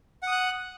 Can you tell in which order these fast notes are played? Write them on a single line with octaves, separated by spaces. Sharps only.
F#5 D#6 F#6